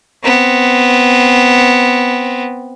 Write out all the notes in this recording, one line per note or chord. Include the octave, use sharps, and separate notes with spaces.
B3 C4